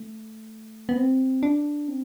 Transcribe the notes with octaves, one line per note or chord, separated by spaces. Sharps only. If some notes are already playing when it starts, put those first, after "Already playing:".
Already playing: A3
B3
C4
D4
C4